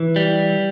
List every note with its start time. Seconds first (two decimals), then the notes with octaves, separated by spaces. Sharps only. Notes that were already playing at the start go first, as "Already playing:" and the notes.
Already playing: E3
0.16 G3